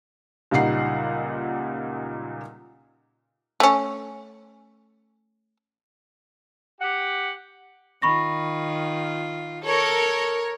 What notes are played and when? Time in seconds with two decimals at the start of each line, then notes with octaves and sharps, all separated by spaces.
0.51 C#2 A#2 G3 D#4 F#5 C7
3.60 A3 C#4
6.81 G4 F#5
8.02 D#3 F4 B5 C#6 A#6
9.65 A4 A#4 C#5